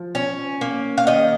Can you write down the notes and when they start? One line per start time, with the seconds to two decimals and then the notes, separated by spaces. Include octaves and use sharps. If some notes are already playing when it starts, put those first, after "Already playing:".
Already playing: F3
0.15 C#4
0.61 A#3
0.98 F5
1.07 D#3 D#5